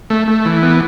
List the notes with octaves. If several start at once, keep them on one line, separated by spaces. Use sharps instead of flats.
A3
A3
E3
B3